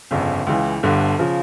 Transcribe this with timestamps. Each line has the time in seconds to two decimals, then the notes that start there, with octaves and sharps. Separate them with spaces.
0.11 G1 F2 C#3
0.47 C#2 C#3 E3
0.83 G1 G2 D3
1.19 C#3 F3